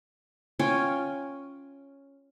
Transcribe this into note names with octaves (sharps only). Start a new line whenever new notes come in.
C#4 F4 G5 G#5